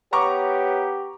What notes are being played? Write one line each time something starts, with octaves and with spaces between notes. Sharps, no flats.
B3 G4 C#5 A#5 C#6 D6